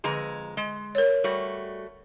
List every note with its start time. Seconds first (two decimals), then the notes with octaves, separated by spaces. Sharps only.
0.04 F2 D3 G#3 A#5
0.57 G#3
0.95 A#4 C#5
1.24 G3 A3 F#4